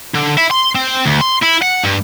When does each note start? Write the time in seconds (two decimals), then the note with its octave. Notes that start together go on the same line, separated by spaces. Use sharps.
0.14 D3
0.37 E4
0.51 C6
0.75 C4
1.06 D2
1.21 C6
1.43 E4
1.62 F#5
1.83 G2